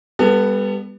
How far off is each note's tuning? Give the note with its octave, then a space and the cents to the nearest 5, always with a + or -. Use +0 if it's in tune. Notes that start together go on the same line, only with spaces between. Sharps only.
G3 +35 B3 +0 A4 +30